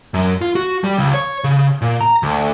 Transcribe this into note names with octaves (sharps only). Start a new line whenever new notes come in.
F#2
F4
F#4
G3
C#2
C#5
C#3
A#2
A#5
D2